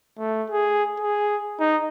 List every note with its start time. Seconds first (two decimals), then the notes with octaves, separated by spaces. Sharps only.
0.18 A3
0.50 G#4
1.00 G#4
1.60 D#4